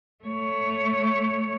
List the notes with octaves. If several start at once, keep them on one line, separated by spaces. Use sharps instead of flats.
A3 C#5